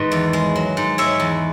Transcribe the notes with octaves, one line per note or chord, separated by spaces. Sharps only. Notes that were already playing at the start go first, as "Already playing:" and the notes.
Already playing: G#2 D#3 B4 D#5
E2
G#3
F#3
G#2
G#3 C#5 E5
E2